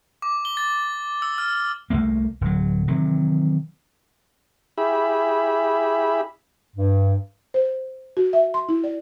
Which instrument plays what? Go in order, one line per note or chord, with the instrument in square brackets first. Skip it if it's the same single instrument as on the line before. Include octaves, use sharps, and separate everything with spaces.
[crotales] D6
G7
A6
E6
F6
[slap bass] C2 F2 A3 A#3
D1 F#3
C3 D#3 E3 F#3
[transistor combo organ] E4 G4 G#4 E5 B5
[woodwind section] G2
[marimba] C5
F#4
E5
C6
E4
D5